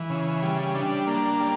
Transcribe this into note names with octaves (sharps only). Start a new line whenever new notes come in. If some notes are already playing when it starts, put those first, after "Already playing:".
Already playing: E3
C#3
G3
D4
A#3
G3